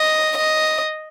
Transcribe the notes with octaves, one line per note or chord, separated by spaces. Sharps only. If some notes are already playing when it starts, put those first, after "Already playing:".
Already playing: D#5
D#5